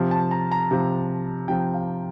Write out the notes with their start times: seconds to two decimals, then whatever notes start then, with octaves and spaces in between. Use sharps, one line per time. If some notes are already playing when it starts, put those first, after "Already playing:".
Already playing: C3 F3
0.11 A5
0.31 A#5
0.52 A#5
0.71 C3 F3
1.48 C3 F3 G5
1.74 F5